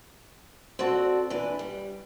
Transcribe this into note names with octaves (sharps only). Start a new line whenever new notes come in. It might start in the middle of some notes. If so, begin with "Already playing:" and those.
C4 F#4 A4 D5
E3 D4 B4
G3